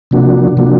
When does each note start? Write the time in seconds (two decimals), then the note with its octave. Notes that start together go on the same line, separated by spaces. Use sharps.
0.11 C3 F3 A#3 D4 F#4
0.57 C3 F3 A#3 D4 F#4